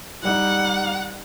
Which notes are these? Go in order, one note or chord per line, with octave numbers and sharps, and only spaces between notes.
G3 D#4 F#5